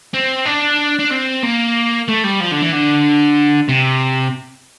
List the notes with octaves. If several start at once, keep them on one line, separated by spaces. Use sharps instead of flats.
C4
D4
D4
C4
A#3
A3
G3
F3
D3
E3
D3
C3